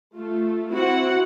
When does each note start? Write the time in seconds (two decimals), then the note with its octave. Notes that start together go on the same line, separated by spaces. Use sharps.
0.15 A3 F4
0.72 C4 E4 F#4 F#5